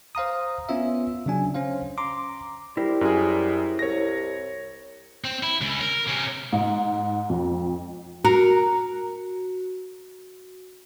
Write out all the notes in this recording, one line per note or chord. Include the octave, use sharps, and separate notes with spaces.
C5 F5 A#5 D#6
B3 C#4 F4 E5
C#3 F#3 D4 G#5
C#4 C5 F5
A#5 C6 D6
G3 E4 A#4 C5
F#2 G#4
C2 C#5 A#6
C4
E4
C#2
A#4
C3 C#4
G#2
F2
F#4 A#4